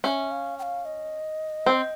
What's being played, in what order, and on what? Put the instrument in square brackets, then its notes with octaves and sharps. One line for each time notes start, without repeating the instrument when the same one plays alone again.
[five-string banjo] C#4 [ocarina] E5
[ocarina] F5
G5
F5
D#5
[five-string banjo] C4